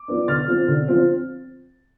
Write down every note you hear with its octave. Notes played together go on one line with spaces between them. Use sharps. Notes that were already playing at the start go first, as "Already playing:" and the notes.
Already playing: D6
F3 B3 D4
D3 F6 A6
F3 C4
D3
F3 C4